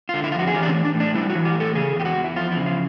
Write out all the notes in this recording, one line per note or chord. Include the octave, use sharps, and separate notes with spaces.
D3 F4
E4
F2 F4
F#4
G#4
E3 G4
D4
C#4
A2
D4
A2
D4
G3 E4
F#4
E3
G4
A2
A4
C#3 G#4
E2 G4
F#4
E2
E4
F3 F4
C#3 E4
F4